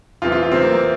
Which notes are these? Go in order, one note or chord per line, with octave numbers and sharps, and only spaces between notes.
E2 C3 E3 F4
F4
F4
E2 C3 E3 C4
A#3
A#3